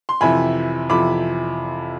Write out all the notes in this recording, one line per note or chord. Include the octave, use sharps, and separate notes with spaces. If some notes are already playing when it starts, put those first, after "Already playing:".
C6
F2 C3 E3 G#5 B5
F2 C3 E3 B5 D6